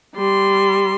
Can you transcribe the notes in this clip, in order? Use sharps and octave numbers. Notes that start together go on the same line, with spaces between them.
G3 C6